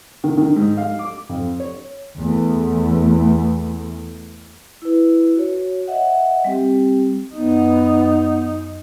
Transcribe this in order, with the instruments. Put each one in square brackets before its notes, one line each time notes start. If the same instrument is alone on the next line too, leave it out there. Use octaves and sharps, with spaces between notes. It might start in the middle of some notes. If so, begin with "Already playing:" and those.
[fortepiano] D#3
D#3
G#2
F5
D6
F2
C#5
[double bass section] E2 A3
[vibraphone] E4 B4
F#4 C#5
D#5 E5 F#5
G3 C4 G4
[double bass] F#2 D#4 [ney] B3